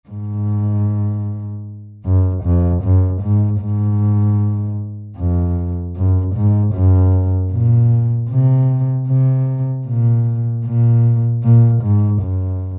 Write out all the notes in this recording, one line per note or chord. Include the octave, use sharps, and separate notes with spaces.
G#2
F#2
F2
F#2
G#2
G#2
F2
F#2
G#2
F#2
A#2
C3
C3
A#2
A#2
A#2
G#2
F#2